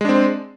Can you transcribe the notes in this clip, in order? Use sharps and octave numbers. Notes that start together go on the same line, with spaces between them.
G#3 C4 D4